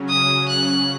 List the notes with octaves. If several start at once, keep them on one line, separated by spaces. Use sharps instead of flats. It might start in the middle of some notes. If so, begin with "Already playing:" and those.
Already playing: C#3 F#3 C#4
D#6
F#6